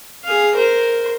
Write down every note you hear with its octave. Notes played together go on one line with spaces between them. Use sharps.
G#4 F5
A#4 C5